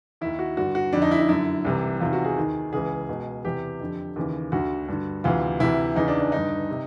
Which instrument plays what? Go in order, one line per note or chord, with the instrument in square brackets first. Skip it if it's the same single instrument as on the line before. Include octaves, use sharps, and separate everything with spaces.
[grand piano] D#2 D#3 E4
F#4
G2 D3 F#4
F#4
F2 D3 D4
D#4
E4
D#4
F#2 D3 E4
C2 C3 E3
E2 C3 D#3 F4
F#4
G#4
D#2 D#3
C#2 C#3 E3 G#4
C#2 B2
E2 C3 E3 G4
F2 D3
D#2 C#3 E3
D2 D3 F#4
G2 D3
D2 C3 E3 F4
D2 C3 E3 E4
E2 C#3 E3 D#4
D4
D4
G2 D3 D#4
C3